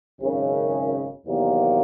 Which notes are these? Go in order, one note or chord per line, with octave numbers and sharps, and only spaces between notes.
G#1 F#2 C#3
E2 C3 D#3 F#3 A#3